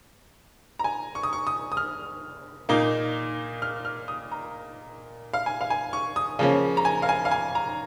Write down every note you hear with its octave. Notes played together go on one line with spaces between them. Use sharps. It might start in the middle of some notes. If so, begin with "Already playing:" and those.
A#5
G#5
C#6
D#6
C#6
D#6
D#6
F6
A#2 A#3 D#4
F6
F6
D#6
A#5
F5
G#5
F5
G#5
C#6
D#6
C#3 F3 A#3 C#4
A#5
G#5
F5
G#5
F5
G#5
A#5